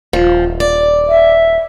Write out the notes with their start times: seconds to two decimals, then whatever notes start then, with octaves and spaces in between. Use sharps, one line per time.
0.13 D#1 F3
0.60 D5
1.08 E5